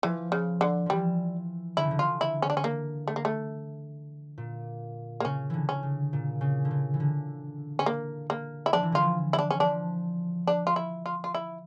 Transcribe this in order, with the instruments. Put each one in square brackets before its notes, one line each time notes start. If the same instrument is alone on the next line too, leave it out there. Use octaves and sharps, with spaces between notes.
[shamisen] E3 [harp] F3
[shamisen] C#3
D3
[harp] E3 F3 [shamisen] G3
[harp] D3 [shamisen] E4
[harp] C#3
D3
[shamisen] F4
E4
C#4
D4
C#4
A#3
A3
A#3
A3
[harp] A#2
[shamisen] A#3
[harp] C#3 [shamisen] C#4
[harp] D3 E3
[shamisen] C#4
[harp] C#3
A#2
C#3
D3
C#3
E3
D3
[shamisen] C#4
A#3
A#3
E4
[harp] F3 [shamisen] D4
[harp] E3
[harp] D3 [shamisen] F4
[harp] E3
[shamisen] E4
D4
C#4
[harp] F3 [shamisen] D4
[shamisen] D4
F4
E4
F4
F4
E4